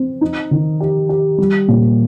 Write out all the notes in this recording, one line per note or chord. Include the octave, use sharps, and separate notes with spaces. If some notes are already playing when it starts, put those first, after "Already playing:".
Already playing: C4
D#4
D#3
G4
G4
G3
A#2